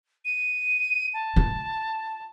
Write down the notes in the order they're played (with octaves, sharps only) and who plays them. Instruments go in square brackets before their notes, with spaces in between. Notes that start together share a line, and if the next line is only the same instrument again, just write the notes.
[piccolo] D#7
A5
[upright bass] F4